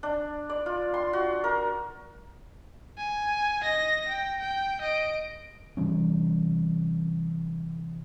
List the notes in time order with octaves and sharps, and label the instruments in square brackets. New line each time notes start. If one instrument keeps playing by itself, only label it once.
[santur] D4
D5
F4
C6
F#4
A#4
[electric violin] G#5
D#5 A#6
G5
G5
D#5 D7
[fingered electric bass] C3 E3 G3 C#4